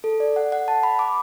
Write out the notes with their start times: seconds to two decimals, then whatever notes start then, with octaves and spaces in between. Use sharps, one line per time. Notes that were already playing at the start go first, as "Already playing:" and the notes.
0.04 A4
0.20 D5
0.36 F#5
0.52 F#5
0.68 A5
0.83 B5
0.99 D6